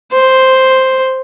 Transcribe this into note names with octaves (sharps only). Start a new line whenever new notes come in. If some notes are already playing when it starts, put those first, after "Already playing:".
C5